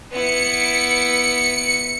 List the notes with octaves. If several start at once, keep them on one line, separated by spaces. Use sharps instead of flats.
B3 E4 C#7